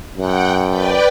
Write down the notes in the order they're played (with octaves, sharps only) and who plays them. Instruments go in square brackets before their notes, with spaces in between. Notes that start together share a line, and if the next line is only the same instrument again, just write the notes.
[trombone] F#2 [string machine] F#5 G5
[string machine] B4 D5 G5